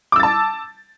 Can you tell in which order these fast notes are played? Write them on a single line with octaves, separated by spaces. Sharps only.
D6 E6 A6 A5